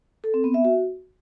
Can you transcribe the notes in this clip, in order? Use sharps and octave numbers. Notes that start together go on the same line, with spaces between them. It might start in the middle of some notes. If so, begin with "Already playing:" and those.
A4
C4
B3
E5
F#4